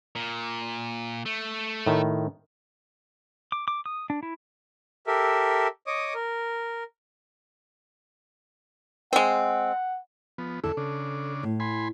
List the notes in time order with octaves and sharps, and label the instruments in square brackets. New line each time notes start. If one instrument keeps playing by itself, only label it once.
[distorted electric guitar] A#2
A3
[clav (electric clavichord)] A2 D#3
[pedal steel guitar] D6
D6
D#6
D4
E4
[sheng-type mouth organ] G4 A4 A#4 E5
C#5 D#5 D6 D#6
A#4
[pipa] G#3 C4 [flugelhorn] F#5
[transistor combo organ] F3 B3
[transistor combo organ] E2 D3 E4 [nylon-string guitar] A4
[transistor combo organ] C#3 D4
[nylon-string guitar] A2
[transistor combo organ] G#5 B5 C6